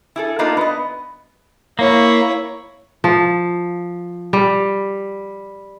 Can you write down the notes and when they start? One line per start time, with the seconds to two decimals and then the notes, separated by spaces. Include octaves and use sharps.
0.16 E4 G#4 A4
0.39 A#3 B3 D4 D#4 F4 A#4
0.57 B3 B4 D#5
1.79 A#3 E4 C#5
3.04 F3
4.33 G3